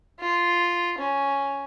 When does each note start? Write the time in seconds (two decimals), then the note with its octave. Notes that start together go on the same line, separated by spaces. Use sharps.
0.20 F4
0.98 C#4